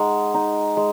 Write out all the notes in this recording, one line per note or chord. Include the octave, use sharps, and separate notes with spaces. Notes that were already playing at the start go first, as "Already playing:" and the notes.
Already playing: G#3 D#4 F#5
D#4
G#3